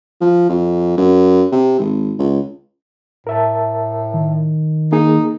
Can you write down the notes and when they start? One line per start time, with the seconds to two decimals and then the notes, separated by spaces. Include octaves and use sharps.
0.21 F3
0.49 F2
0.98 F#2
1.52 C3
1.79 G#1
2.19 C#2
3.27 A2 A#4 E5 A5
4.14 D#3
4.92 A#3 D#4 G#4